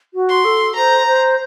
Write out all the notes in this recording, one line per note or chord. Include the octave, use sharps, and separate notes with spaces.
F#4
C6
A4
C5 A#5
C5